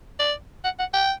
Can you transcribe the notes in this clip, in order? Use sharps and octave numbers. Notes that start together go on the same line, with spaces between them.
D5
F#5
F#5
G5